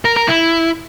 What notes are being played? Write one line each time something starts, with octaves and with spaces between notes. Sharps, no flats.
A#4
A#4
E4